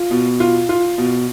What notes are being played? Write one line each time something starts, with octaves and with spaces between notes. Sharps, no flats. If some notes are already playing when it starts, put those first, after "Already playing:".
Already playing: F4
B2
F4
F4
B2